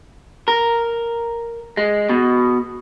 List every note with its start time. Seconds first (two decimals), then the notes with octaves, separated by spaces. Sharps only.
0.48 A#4
1.77 G#3
2.09 B2